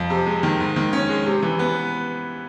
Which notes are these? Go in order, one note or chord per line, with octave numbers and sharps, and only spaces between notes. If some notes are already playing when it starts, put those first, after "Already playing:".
Already playing: F2
C3
G#3
D#3
G#2
D#3
C#4
G#3
C3
E3
B3